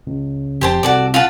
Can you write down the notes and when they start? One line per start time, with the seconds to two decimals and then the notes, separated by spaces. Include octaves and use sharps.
0.07 C#2
0.61 F1 G4 C5 A5
0.83 C2 F#4 A4 D5
1.14 F4 F#5 A5